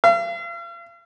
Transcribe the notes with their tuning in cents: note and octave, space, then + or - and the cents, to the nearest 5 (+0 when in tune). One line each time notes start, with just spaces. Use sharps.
F5 -45